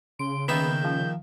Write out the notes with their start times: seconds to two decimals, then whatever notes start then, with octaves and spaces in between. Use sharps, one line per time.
0.19 C#3 C6 D7
0.48 D#3 A#3 B3 E5 G6
0.85 F3